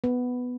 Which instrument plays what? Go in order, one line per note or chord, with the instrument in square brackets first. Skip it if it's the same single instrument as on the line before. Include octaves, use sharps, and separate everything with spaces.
[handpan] B3